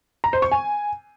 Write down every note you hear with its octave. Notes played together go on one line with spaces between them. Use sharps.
A#5
C5
C#6
G#5